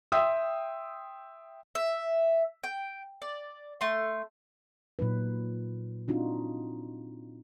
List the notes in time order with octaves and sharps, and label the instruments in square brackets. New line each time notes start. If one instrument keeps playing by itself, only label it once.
[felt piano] E5 G5 C6 D#6 E6
[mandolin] E5
G5
D5
A3 C6
[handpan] A#2 F#3 D#4 B4
C4 D4 D#4 F4 F#4